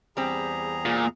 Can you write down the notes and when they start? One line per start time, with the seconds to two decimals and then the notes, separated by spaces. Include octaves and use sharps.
0.17 E2 G3 C4 G#4 A#5
0.85 A#2